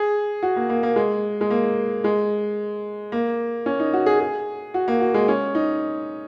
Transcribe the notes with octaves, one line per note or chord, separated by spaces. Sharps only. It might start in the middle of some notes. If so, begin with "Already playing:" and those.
Already playing: G#4
F#4
A#3
A#3
A#3
G#3
G#3
A#3
G#3
A#3
C#4
D#4
F#4
G#4
G#4
F#4
A#3
F#4
G#3
C#4
D#4